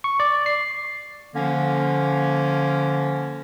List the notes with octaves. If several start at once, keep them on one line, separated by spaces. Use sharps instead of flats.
C#6
D5
C7
D3 F3 A#3 C#4